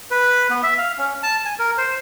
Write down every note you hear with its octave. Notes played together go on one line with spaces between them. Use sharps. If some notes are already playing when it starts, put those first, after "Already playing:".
B4
B3
E5
F5
C#4
A5
G#5
A#4
C5